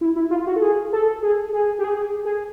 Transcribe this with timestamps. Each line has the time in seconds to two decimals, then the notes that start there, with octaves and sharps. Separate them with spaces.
0.01 E4
0.16 E4
0.31 F4
0.47 F#4
0.56 A4
0.62 G#4
0.93 A4
1.23 G#4
1.53 G#4
1.79 G4
1.84 G#4
2.25 G#4